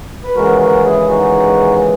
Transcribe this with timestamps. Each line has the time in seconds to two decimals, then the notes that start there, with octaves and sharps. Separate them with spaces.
0.24 B4
0.35 D#2 C#3 E3 G#3 F#4 A#4
0.59 F#4 A#4
0.83 E4 G#4
1.08 D#4 F#4